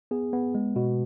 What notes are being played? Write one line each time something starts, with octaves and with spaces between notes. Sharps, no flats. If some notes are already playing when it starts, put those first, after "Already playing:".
B3 G#4
B3
G#3
B2